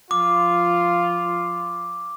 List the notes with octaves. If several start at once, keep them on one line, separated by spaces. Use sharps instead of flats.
F3 F4 D6